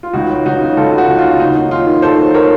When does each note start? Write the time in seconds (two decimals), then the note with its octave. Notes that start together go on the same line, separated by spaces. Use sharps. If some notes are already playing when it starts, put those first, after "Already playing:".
0.03 F4
0.13 C#2 D#4 F#4
0.30 F#3
0.45 C#2 D#4 F#4
0.61 C#3
0.77 C#2 F4 A4
0.93 F#3
0.98 D#4 F#4
1.08 C#2
1.19 F4
1.24 C#3
1.40 D#2 D#4
1.55 F#3 D#4
1.71 D#2 F4
1.86 D#3
2.02 D#2 A4 C5
2.18 F#3
2.34 A#4 C#5